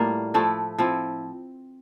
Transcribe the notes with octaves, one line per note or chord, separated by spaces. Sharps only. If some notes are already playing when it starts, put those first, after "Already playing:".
Already playing: A2 G3 A#3 F4
F3 A3 E4
F3 C4 E4